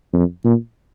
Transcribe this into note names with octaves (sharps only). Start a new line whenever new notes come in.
F2
A#2